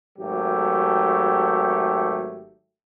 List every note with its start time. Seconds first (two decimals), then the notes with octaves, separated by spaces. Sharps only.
0.19 G#1 F#3 A3 G4